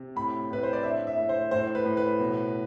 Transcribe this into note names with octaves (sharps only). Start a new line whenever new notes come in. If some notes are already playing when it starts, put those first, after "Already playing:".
Already playing: C3
A2 B5
A2 B4
C5
D5
D4 E5
E5
A2
C5
A2 C5
B4
A2
B4
B2